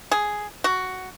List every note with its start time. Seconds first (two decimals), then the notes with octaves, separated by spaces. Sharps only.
0.11 G#4
0.64 F#4